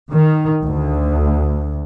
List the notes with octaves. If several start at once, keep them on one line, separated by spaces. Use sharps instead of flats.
D#3
D2